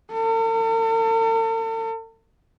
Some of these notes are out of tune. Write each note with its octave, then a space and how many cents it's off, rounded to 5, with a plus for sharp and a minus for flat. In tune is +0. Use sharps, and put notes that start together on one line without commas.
A4 +45